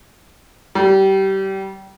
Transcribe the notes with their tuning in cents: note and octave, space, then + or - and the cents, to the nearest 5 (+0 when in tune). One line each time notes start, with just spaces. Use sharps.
G3 -25